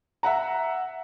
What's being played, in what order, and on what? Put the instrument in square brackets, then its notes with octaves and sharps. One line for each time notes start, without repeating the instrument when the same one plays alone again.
[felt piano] E5 F#5 A#5